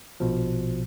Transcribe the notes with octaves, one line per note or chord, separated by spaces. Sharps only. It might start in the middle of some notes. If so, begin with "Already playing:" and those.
A#1 B2 F3